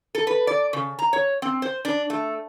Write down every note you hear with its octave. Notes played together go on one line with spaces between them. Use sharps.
A4
B4
D5
C#3
A#5
C#5
C4
C5
D4
A3